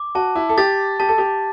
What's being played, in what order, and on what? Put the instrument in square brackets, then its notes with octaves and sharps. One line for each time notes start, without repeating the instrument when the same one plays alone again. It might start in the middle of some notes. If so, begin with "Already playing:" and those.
Already playing: [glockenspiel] D6
[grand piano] F#4 [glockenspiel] A5
[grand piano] E4
A4
[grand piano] G4 [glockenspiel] A6
[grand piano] G4 [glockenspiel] A5
[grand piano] A4
G4